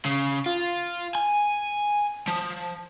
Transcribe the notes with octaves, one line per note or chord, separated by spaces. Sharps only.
C#3
F4
G#5
F3